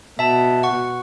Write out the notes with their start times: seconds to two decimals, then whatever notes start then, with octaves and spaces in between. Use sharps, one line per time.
0.19 B2 E5 A5
0.63 F#5 C#6